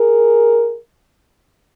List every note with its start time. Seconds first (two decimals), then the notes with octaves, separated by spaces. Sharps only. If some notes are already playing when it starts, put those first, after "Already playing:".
Already playing: G#4 A#4